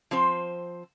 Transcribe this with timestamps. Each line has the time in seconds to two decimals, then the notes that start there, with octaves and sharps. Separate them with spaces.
0.11 F3 C4 C5